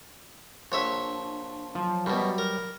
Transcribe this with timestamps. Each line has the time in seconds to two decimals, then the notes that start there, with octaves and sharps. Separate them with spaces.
0.72 A#1 D4 C#5 E5
1.75 F3 F#3
2.06 F#2 B2 G3
2.38 A#4